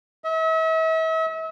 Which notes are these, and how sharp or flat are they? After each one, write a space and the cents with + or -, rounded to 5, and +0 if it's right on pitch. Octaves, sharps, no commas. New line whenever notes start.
E5 -40